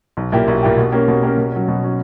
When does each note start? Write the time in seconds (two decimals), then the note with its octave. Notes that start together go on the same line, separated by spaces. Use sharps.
0.17 B1
0.32 A#2 A#3 E4 G4
0.48 B1
0.63 A#2 A#3 E4 G4
0.77 B2
0.92 A#3 C#4 G4 A#4
1.08 B2
1.22 A#3 C#4 G4 A#4
1.37 B2
1.52 F#3 C#4
1.68 B2
1.83 F#3 C#4